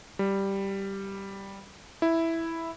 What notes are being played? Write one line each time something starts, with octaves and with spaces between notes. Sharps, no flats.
G3
E4